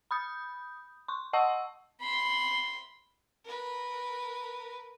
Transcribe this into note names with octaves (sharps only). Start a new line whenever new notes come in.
B5 D#6 G6
C6 C#6
D#5 F#5 A5 C#6 E6
B5 C6
A#4 B4